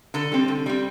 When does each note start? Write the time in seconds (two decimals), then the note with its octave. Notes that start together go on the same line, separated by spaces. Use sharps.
0.14 D3 A4
0.32 G3 C4
0.48 D3
0.66 G3 C4